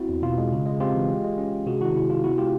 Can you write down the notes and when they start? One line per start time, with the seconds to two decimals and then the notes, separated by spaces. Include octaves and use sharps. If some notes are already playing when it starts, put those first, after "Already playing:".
Already playing: C4 E4 F#4
0.09 E2
0.22 B2 F4
0.38 G#3
0.52 C#3
0.66 G#3
0.80 C4 F4 G4
0.95 E3
1.10 G#3
1.24 G#3
1.38 C#4
1.53 G#3
1.66 C3 F#4 G#4
1.81 D#3 E4 F#4
1.95 C3 E4
2.09 C3 F4
2.24 B3 E4 F#4
2.38 G#3 F4 G4